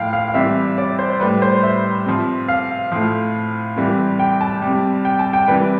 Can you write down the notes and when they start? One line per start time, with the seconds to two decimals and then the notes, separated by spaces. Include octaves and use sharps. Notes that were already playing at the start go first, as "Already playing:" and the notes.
Already playing: A2 F3 F5 G5
0.13 F5
0.28 F5
0.34 C3 E3 G3 E5
0.78 D5
0.99 C5
1.20 A2 G3 B4
1.42 C5
1.63 E5
2.06 C3 F3
2.48 F5
2.92 A2 F3
3.76 C3 E3 G3
4.19 G5
4.41 A5
4.62 C3 G3
5.05 G5
5.19 A5
5.33 G5
5.48 C3 E3 G3 B4